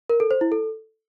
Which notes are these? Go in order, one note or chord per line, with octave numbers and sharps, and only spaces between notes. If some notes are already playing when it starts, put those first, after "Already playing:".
A#4
A4
C5
E4
A4